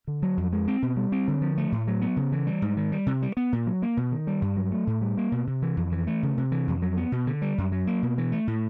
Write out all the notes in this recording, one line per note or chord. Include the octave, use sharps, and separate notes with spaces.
D3
F#3
F2
G#3
C4
B2
G3
C4
D3
F3
A3
A2
F#3
B3
C#3
E3
G3
G#2
D#3
G3
C3
G3
B3
A#2
F#3
A#3
B2
D#3
G3
G2
F#3
A3
A2
G3
A#3
B2
C3
E3
F2
E3
A3
C#3
C3
E3
F2
F#3
B3
B2
D3
G3
F#2
F#3
A#3
B2
E3
A3
A2